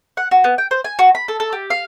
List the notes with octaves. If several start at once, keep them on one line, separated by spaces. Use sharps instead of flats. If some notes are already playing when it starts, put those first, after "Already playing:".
F#5
F#4
B3
G5
C5
G#5
F#4
B5
A4
A4
G4
F5